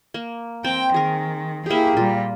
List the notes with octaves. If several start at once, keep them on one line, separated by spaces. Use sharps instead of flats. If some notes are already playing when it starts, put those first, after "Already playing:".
A#3
C4 G5
D#3 G#4 A#4
A#3 E4 G4 G#4
A#2 G3 F4